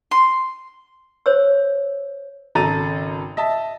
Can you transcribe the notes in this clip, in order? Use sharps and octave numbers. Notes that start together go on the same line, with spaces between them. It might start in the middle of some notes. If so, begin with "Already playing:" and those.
C6
C5 C#5 E6
G#1 C#3 A4 A#5 A6 D#7
D#5 E5 A5